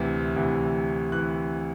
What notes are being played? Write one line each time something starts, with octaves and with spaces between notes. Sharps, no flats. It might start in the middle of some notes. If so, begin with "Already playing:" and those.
Already playing: D2 C3 E3
D2 C3 E3
E3 F#6